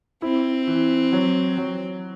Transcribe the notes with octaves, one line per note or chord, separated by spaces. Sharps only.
C4 E4
E3
F#3
F#3